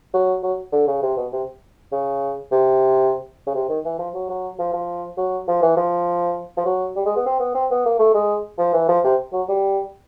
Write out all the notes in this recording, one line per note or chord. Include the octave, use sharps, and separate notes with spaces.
F#3
F#3
D3
C#3
C3
B2
C3
C#3
C3
C#3
C3
D#3
E3
F3
F#3
F#3
F3
F3
F#3
F3
E3
F3
F3
F#3
G3
G#3
B3
C4
B3
C4
B3
A#3
A3
G#3
F3
E3
F3
C3
F#3
G3